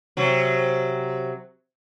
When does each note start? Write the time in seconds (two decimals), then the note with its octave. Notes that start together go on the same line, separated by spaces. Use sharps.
0.17 C3 F#3